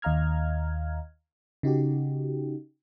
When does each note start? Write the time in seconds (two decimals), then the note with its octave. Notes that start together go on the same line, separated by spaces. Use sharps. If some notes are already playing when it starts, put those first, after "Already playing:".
0.02 D#2 D#5 F5 A#5 F6 G#6
1.63 C#3 D#4 F#4 G4